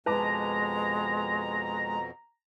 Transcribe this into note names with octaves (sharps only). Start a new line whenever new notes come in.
F2 B2 G#3 B4 A5 A#5 D6